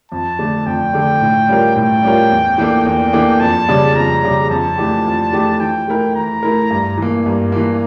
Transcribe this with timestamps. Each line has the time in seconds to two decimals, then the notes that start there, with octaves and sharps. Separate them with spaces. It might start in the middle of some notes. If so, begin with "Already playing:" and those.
0.12 F2 A5
0.39 D3 A3 D4
0.66 F2 G5
0.94 D3 A3 D4
1.21 A2
1.49 G3 C#4 F4 A#4
1.76 A2 G5
2.03 G3 C#4 F4 A#4
2.32 E2
2.58 E3 A#3 D4 A4
2.86 E2 G5
3.13 E3 A#3 D4 A4
3.40 F2 A5
3.68 C#3 G3 D4
3.95 F2 A#5
4.23 C#3 G3 D4
4.50 F2 A5
4.78 E3 A3 D4 G4
5.06 F2
5.33 E3 A3 D4 G4
5.60 E3 G5
5.88 A3 E4 A#4
6.15 E3 A#5
6.43 A3 E4 A#4
6.70 G2
6.97 E3 A#3
7.26 G2 A#5
7.52 E3 A#3